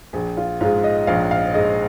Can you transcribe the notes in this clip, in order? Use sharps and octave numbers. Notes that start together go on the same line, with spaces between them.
A#1 G#4
F4
G#2 G#3 F4
D#5
A#1 F5
F5
G#2 G#3 D#5